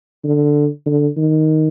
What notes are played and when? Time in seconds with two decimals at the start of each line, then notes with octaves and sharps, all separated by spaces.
0.24 D3
0.86 D3
1.17 D#3